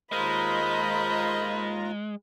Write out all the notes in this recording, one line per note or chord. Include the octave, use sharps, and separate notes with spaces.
D#2 G#3 F4 A#4 C5 D#5 A#5 B5